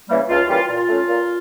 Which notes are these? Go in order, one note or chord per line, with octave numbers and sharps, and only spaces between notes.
C#3 E3 G3 A#3
C#2 F4
C#3 E3 G3 A#3 F4
A#2 F4
A3 C#4
A#2